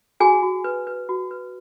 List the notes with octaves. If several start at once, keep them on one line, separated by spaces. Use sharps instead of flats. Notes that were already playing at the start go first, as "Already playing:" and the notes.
F#4 G#4 G#5
F#4
B4
B4
F#4
B4